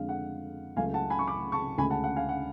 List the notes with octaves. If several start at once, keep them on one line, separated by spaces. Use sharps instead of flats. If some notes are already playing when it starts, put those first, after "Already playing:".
Already playing: F2 D3 G#3 F5
F#5
C#2 C#3 F#3 A3 F5 G#5
F#5 A5
G#5 B5
C#6
B5 D6
A5 C#6
D2 C#3 G#3 G#5 B5
F#5 A5
F#5
F5 G#5
F#5